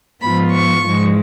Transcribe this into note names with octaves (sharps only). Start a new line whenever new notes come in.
G#2 F3 B3 F4 B5
C#6
G#2 F3 G#3